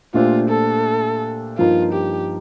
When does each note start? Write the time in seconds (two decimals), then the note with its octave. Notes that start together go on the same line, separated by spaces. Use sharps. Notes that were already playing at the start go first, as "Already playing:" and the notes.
0.14 A#2 A3 D4 F4 G4 C5
0.50 A4
1.58 G2 F3 A#3 D#4 F4
1.93 G4